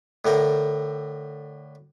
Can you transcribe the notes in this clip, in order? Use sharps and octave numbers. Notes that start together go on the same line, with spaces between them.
A2 D3 A#4 G5